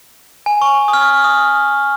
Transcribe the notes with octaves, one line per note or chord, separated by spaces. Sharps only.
G#5
C#6
D#6
F6
D#6